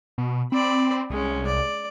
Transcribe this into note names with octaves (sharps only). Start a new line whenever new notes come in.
B2
C4 D5 B5
C2 G#3 C#4
D5